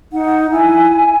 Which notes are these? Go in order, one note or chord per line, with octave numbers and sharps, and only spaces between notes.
D#4 F#5
E4 G#5